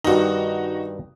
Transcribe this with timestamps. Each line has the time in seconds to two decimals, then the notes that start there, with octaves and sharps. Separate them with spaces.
0.04 G2 D#3 D#4 F#4